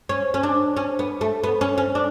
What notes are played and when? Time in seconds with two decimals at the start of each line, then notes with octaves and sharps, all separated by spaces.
0.09 C#4
0.34 C#4
0.43 D4
0.77 C#4
0.99 B3
1.21 A3
1.44 B3
1.61 C#4
1.78 C#4
1.95 D4